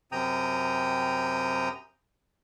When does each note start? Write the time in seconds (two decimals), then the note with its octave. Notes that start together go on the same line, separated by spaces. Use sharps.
0.12 F#2 C3 G5 A#5 D#6